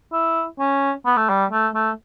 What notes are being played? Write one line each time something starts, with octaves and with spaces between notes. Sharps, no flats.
E4
C#4
B3
A3
G3
A3
A3